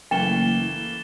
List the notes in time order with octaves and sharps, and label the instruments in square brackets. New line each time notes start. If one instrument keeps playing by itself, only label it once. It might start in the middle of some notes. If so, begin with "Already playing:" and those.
[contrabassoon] F#1 [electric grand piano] E3 A3 A#3 [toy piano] G5 [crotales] A6 E7 G7